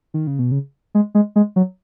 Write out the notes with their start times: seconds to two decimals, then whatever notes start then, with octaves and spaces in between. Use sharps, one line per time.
0.14 D#3
0.27 C#3
0.39 B2
0.52 C#3
0.95 G#3
1.15 G#3
1.36 G#3
1.56 F#3